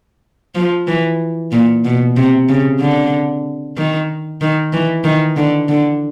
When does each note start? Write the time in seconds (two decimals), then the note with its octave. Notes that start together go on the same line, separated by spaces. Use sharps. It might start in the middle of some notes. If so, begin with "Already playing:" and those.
0.55 F3
0.87 E3
1.52 A#2
1.85 B2
2.17 C3
2.49 C#3
2.80 D3
3.77 D#3
4.41 D#3
4.73 E3
5.04 D#3
5.37 D3
5.69 D3